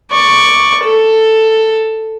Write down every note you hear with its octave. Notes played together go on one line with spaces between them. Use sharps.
D5 C#6
A4